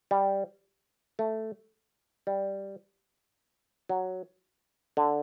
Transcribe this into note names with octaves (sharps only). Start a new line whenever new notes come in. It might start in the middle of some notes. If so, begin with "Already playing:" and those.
G3
A3
G3
F#3
D3